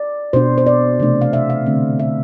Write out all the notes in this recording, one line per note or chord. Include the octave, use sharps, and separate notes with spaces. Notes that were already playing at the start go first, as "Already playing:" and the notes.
Already playing: D5
B2 B3 D4 C5
C5
D5
C3 E3 A3 D4
F5
E5
F5
D3 A3 C4
E5